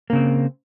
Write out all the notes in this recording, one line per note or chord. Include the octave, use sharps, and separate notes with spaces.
C#3 A#3 C4